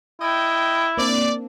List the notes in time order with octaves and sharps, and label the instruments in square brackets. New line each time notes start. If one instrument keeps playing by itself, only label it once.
[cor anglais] E4 [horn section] D#5 G5
[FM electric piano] A#3 C4 D4 [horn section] D5